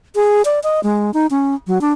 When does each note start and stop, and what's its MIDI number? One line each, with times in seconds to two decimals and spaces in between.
0.15 0.42 68
0.45 0.59 74
0.63 0.80 75
0.83 1.13 56
1.14 1.27 63
1.30 1.55 61
1.67 1.81 54
1.81 1.92 62